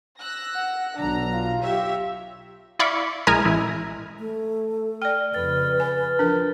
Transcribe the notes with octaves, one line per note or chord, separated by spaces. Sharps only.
E6 F#6 A#6
F#5
B1 D4 A#5
F4
G4 C#5 E5
E4 D5 F5 B5 C#6
A#1 G#3 E4 A#4 G#5 A#5
A1 E4
A3
D5 G5 F6
F2 C#3 B4 A6
G#5
F3 D4 A#4